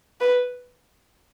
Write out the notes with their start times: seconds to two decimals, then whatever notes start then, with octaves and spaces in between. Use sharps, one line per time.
0.20 B4